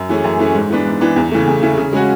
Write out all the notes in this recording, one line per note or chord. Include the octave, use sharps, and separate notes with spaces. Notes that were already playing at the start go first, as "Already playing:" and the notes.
Already playing: F#2
E3 A3 C#4 G#4
F#2
E3 A3 C#4 G#4
G#2
E3 B3 D4
G#2
E3 B3 D4
E2
C#3 E3 A3
E2
C#3 E3 A3
C#3
G#3 C#4 F#4